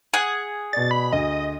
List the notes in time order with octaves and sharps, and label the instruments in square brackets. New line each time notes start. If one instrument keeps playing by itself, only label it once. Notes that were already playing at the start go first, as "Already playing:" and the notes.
[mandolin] G#4 F#5
[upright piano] B2 D5 [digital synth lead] A6
[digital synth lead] B5
[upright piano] D2 [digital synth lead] D#5